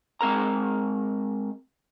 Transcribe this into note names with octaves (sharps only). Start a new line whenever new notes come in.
G#3 C4 A#4 A#5